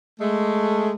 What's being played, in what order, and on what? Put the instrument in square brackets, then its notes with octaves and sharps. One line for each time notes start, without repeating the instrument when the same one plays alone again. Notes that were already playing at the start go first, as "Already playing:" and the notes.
[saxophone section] G#3 A3